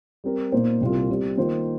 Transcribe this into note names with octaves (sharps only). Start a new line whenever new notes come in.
G3 C4 G4 A#4
A#2 A#3 D#4 C5
C2 C3 G3 A#3 F4
C3 G3 C4
D#3 A#3 F4 C5